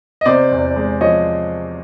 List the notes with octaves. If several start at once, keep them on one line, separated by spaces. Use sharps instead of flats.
D#5
C3 C5 D5
E2
G#3
F3 C#5 D#5